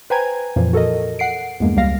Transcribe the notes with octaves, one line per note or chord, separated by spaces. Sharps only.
B4 C5 G5 G#5 A#5 G#6
F2 A#2 E3 F3
F#4 A4 A#4 D#5
F#5 C7 D7
E2 G2 G#3 A#3
C#2 G3 G#3 A#3 F5 A#6